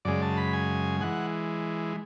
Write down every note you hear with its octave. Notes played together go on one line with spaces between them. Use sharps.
F#2 C#3 G#3 D5
A5
B5
G#5
E3 G#3 F#5